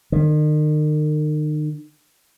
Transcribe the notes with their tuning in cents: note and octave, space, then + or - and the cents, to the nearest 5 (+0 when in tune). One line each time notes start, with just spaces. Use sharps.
D#3 -40